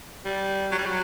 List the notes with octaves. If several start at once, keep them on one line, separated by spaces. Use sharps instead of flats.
G3
F#3
G3
F#3